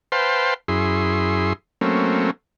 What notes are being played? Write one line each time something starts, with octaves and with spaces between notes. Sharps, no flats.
B4 C5 F5 G5 A5 C6
F#2 E4 G#4 C6
F#3 A3 A#3 C4 C#4